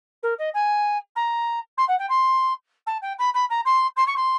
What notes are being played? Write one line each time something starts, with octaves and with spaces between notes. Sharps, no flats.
A#4
D#5
G#5
A#5
C6
F#5
G5
C6
A5
G5
B5
B5
A#5
C6
C6
C#6
C6